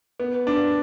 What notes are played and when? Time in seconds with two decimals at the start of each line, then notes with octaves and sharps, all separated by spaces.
0.20 B3
0.47 D4